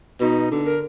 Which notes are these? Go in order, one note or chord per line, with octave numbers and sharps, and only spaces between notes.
B2 D#4
D3
A#4